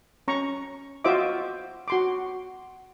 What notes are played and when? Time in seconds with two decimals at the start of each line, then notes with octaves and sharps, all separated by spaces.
0.28 C#4 A#5 C#6
1.04 F4 F#4 C5 D#5 E5 D6
1.88 F#4 C6 D6